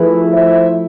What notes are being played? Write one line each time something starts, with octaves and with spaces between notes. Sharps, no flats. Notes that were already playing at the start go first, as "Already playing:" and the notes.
Already playing: F3 A3 E4 G#4 B4
C5 E5